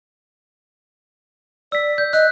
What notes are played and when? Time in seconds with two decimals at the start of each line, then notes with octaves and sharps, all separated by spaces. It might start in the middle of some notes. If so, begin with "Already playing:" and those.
1.72 D5 E6 B6
1.98 G6
2.13 D#5 F#6